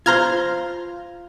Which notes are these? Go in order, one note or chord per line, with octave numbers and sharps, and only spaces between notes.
F4 C5 A#5 F6 G#6